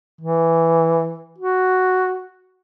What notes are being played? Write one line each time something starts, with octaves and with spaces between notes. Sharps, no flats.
E3
F#4